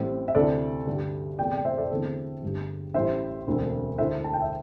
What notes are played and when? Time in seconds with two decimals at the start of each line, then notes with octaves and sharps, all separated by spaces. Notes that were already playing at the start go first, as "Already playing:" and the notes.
Already playing: A1 A2 G3 C4
0.28 E5
0.35 D2 C3 A3 C4 E4 A4 D5
0.87 G2 D3 G3 D4
1.39 E2 C3 A3 D5 G5
1.52 D5 G5
1.65 C5 E5
1.78 A4 D5
1.86 C5
1.91 E2 D3 C4 E4 A4
2.42 G1 G2 G3
2.94 A1 A2 G3 E4 C5 E5
3.47 E1 D2 D3 C4
3.98 D2 D3 A3 E4 C5 E5
4.24 A5
4.34 G5
4.42 E5